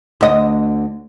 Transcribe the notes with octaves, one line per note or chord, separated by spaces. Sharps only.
D2 D#5